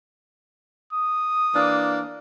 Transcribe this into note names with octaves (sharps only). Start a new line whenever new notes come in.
D#6
E3 A#3 D4